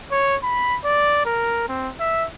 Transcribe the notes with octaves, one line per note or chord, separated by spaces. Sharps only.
C#5
B5
D5
A#4
C4
E5